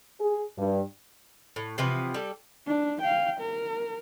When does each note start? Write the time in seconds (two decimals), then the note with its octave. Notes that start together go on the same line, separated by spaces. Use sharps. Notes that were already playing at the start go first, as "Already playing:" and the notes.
0.20 G#4
0.57 G2
1.56 A2
1.78 C3 E3 F3 B3
2.14 G3 A4
2.66 D4
3.00 F5 G5
3.39 A#4